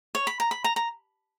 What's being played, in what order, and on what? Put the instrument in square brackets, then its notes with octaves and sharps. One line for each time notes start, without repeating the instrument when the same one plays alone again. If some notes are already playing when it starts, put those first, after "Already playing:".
[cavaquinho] C#5
B5
A#5
B5
A#5
A#5